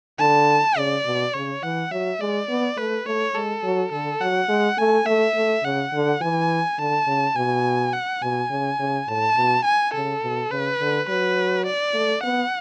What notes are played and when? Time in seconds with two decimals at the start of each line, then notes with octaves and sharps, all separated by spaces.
0.19 D3 A5
0.76 C#3 D5
1.05 B2
1.33 C#3 C#5
1.63 E3 F#5
1.91 F#3 E5
2.20 G#3 D5
2.49 B3
2.77 A3 B4
3.06 A3 C#5
3.35 G#3 A4
3.63 F#3
3.92 D3 A4
4.21 F#3 F#5
4.49 G#3
4.78 A3 G#5
5.06 A3 E5
5.35 A3
5.64 C#3 F#5
5.93 D3
6.21 E3 G#5
6.78 D3 A5
7.07 C#3
7.36 B2 G#5
7.93 F#5
8.22 B2 G#5
8.50 C#3
8.79 C#3
9.08 A2 A5
9.36 B2
9.65 G#5
9.94 C#3 A4
10.22 B2
10.51 C#3 B4
10.80 D3
11.08 F#3 B4
11.66 D5
11.94 A3
12.23 B3 F#5